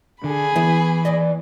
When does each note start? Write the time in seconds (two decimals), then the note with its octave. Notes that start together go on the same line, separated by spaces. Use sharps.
0.24 D3 G#4 B5
0.56 E3 B3 E4
1.05 D#2 D5 D#5